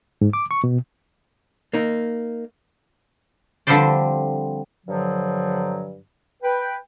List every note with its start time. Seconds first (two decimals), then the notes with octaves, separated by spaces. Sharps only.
0.21 G#2
0.33 D6
0.51 C#6
0.64 B2
1.73 A#3 D#4
3.67 D3 F3 G3 C4 C5 D5
4.87 G2 D3 F3 F#3
6.43 B4 G5